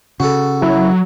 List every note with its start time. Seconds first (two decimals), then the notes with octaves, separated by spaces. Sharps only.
0.20 C#3 F#4 A4
0.62 F#3 E4